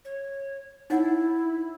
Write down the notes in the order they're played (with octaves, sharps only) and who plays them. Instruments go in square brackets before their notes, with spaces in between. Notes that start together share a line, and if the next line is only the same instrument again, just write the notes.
[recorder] C#5
[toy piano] D#4 C#5 F#5 [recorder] E4